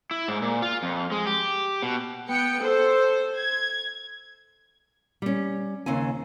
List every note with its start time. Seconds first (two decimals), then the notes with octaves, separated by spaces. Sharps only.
0.11 E4
0.28 G#2
0.42 A#2
0.62 F4
0.83 F2
1.12 G#3
1.27 G4
1.83 B2
2.28 B3 G5 C#7
2.61 A4 C5
3.36 G#6
5.22 G3 C#4
5.86 D#2 C#3 C4 G#5